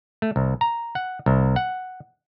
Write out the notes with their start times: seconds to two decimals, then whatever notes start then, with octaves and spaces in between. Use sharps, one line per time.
0.22 A3
0.36 C2
0.61 A#5
0.95 F#5
1.26 C2
1.56 F#5